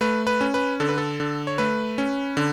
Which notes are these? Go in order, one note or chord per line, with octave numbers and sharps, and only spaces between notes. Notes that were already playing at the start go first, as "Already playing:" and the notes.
A3 B4
B4
C#4
B4
D3 A4
B4
A4
D3
C#5
A3 B4
C#4
D3